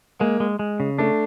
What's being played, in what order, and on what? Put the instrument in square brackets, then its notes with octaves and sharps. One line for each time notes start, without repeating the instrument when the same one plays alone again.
[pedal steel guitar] G#3 [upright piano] A#3
[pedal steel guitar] G#3
G#3
C#3
[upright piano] A3 [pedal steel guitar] D4